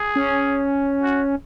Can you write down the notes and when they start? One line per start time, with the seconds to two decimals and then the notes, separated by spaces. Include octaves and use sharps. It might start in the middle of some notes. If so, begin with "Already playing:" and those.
Already playing: G#4
0.16 C#4
1.02 F#4